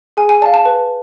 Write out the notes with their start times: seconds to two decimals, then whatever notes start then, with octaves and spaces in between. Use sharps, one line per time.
0.17 G#4 G#5
0.29 G#5
0.42 D5 A5
0.46 F5
0.54 A5
0.65 B4